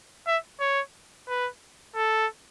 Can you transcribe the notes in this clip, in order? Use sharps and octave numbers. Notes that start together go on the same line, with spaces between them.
E5
C#5
B4
A4